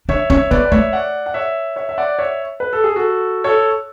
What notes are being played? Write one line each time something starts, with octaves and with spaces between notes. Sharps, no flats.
D4 C#5 E5
C#4 C#5 E5
B3 B4 D5
D5
A3 C#5 E5
D5 F#5
F#5
C#5 E5
C#5 E5
E5
D5 F#5
C#5 E5
B4
A4
G#4
F#4 A4
A4 C#5